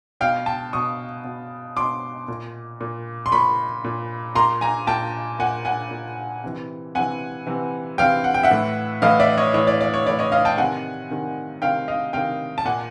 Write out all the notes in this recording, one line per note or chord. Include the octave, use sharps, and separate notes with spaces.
B2 F5 G5
G5 A5
B2 C#6 D#6
B2
B2 C6 D6
A#2
A#2
C6
A#2 B5 C#6
A#2
A#2 A#5 C6
G#5 A#5
A#2 G5 A5
A#2 F#5 G#5
F#5 G#5
A#2
C3 E3
C3 E3 F#5 G#5
C3 E3
C3 E3 F5 G5
F#5
G5
E5 F#5
A2 E3
A2 E3 D#5 F5
D5 E5
C#5 D#5
A2 E3 C#5 D#5
D5
D5
C#5
A2 E3 D5
C#5 D#5
D#5 F5
G5 A5
C3 D#3 F#5 G#5
C3 D#3
C3 D#3 F5 G5
D#5 F5
C3 D#3 F5 G5
A5
A#2 F#5 G#5